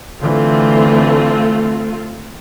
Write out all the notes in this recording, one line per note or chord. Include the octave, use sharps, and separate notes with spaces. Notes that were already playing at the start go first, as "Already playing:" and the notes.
D3 E3 A3 C4 F4